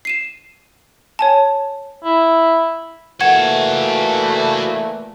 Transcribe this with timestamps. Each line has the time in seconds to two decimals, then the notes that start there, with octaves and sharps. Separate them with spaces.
0.05 C7 D#7 E7
1.19 C#5 G#5 A5
2.04 E4
3.21 A#2 E3 A3 F#4 F#5 A5 G#6